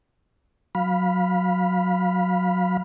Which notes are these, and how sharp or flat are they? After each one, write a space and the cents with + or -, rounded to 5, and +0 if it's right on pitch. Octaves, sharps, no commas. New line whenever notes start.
F#3 -15 F5 +10 B5 -5